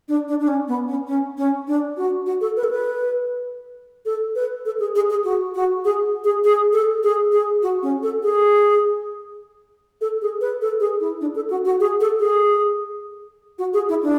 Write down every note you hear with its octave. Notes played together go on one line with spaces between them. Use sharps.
D4
D4
D4
C#4
B3
C#4
C#4
C#4
D4
F#4
F#4
A4
B4
A4
B4
A4
B4
A4
G#4
G#4
G#4
F#4
F#4
G#4
G#4
G#4
A4
G#4
G#4
F#4
C#4
A4
G#4
A4
G#4
B4
A4
G#4
E4
D4
A4
F#4
F#4
G#4
A4
G#4
F#4
G#4
E4
D4